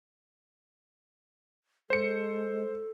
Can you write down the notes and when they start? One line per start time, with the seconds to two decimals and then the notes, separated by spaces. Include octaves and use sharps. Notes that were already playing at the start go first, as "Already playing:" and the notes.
1.90 G#3 A4 C5 C#7